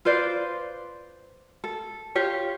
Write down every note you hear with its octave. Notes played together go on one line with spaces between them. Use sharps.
F4 B4 C5 D5
A4
F4 G4 C#5